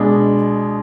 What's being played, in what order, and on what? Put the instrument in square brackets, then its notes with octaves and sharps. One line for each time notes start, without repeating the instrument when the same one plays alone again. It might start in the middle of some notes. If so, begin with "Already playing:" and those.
Already playing: [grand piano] B2 G#3 D4